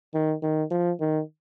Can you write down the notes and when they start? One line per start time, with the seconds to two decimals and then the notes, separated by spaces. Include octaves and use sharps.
0.14 D#3
0.43 D#3
0.71 F3
1.01 D#3